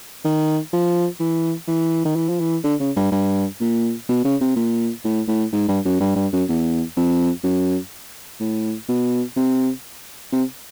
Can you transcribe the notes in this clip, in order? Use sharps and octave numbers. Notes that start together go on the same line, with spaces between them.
D#3
F3
E3
E3
D#3
E3
F3
E3
D3
C#3
G2
G2
A#2
B2
C#3
C3
A#2
A2
A2
G#2
G2
F#2
G2
G2
F#2
E2
F2
F#2
A2
B2
C3
C3